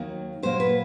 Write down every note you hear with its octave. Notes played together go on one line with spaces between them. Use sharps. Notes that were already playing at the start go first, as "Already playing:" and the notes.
Already playing: D#2 D#3 F#3 A#3
A#2 F#3 A#3 C5
B4